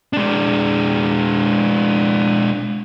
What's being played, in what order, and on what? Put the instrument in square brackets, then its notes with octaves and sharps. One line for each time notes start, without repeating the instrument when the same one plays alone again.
[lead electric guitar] G#3 D4